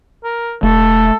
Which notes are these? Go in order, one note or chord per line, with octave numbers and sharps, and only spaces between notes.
A#4
E1 A3 A4